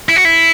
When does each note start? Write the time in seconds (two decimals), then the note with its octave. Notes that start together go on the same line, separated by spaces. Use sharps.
0.09 E4
0.16 F#4
0.25 E4